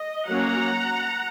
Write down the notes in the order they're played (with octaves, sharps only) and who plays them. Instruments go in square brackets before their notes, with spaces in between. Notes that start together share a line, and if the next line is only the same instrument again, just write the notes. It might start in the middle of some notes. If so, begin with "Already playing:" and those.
Already playing: [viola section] D#5
F#3 A#3 C#4 F#5 A#5